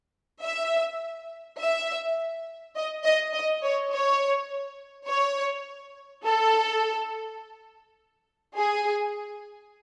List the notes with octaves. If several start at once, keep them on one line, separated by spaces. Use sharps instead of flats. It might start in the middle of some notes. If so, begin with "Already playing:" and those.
E5
E5
D#5
D#5
D#5
C#5
C#5
C#5
A4
G#4